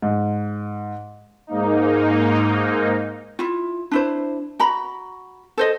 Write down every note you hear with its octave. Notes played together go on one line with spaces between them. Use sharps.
G#2
G#2 A#3 D#4
E4 F4
D4 E4 C5
F#4 A#5 B5
A4 C5 D#5